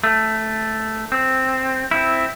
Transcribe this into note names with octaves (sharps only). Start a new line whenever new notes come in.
A3
C4
C4 E4